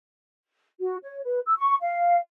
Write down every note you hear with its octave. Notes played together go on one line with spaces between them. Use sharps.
F#4
C#5
B4
E6
C#6
F5